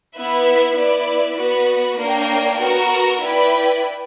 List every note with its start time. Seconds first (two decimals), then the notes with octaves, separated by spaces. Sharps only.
0.17 B3 E4 B4 E5
0.77 B3 E4 B4 D5
1.37 B3 F#4 B4
1.98 A#3 D4 A#4 C#5 G5
2.60 B3 F#4 A#4
3.21 E4 B4 D5 G5